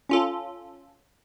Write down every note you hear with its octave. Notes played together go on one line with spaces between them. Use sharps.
C#4 F4 A4